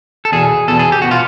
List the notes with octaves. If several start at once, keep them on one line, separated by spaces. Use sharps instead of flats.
A4
E2 B2 G#4
E2 B2 A4
G#4
G4
B2 F#4
F4